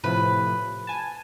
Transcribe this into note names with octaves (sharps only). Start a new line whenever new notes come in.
A2 C3 F3 B4
G#5 A5